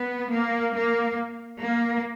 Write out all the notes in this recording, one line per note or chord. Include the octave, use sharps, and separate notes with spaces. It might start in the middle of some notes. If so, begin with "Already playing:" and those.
Already playing: B3
A#3
A#3
A#3